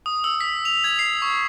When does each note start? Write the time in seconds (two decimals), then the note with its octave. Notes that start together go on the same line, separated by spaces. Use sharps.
0.06 D#6
0.24 E6
0.41 B6
0.65 F7
0.84 G#6
0.99 C7
1.22 C#6